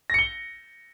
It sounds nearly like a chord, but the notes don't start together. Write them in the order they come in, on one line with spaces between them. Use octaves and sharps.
A#6 C#7 G7